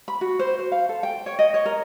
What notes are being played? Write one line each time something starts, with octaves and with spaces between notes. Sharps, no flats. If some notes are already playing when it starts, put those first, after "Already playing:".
B5
F#4
C5
C5
F5
A4
G5
C#5
D#5
C#5
A#4